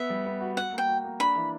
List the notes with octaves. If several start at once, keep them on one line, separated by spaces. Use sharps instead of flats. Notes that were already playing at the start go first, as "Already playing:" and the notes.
Already playing: B3 E5
G3
B3
F#4
F#4 F#5
A#3
G5
F#4
A#3
D4 B5
E3